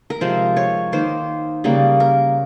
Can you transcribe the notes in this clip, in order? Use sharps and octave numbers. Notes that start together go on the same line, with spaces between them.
A#4
C3 F3 G#3 C5
C#5
D#3 A#3 C5
C#3 G3 A#3
A#4